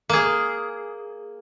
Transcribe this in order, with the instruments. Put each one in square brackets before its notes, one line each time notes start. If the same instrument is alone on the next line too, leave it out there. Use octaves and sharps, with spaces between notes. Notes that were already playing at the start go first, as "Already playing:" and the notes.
[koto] A#3 G#4